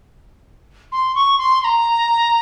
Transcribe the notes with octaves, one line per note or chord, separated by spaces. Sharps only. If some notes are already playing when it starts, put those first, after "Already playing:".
C6
C#6
C6
C6
A#5